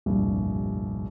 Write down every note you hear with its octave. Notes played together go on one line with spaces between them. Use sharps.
F1 C2 G2 A#2